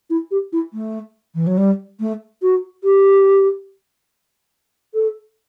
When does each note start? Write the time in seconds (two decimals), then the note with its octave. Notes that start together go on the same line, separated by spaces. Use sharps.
0.10 E4
0.31 G4
0.52 E4
0.73 A3
1.35 E3
1.47 F#3
1.57 G3
2.00 A3
2.42 F#4
2.84 G4
4.94 A4